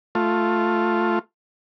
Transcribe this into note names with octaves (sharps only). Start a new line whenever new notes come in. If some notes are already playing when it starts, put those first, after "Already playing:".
A3 F4